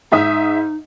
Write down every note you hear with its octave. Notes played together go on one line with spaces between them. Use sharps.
G#2 D#4 E5 D#6